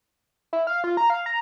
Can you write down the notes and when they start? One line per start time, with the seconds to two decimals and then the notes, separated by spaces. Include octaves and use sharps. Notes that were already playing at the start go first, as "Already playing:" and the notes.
0.53 E4
0.67 F5
0.84 F4
0.97 A#5
1.10 F5
1.26 A#5